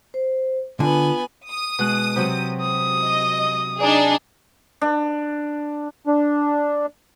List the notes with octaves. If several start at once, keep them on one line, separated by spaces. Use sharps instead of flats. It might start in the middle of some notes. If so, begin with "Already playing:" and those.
C5
D3 B3 F4 G#5
D#6
B2 G#3 F#6
C3 F#3 C4
D#6
D#5
D4 D#4 G#4 D5
D4
D4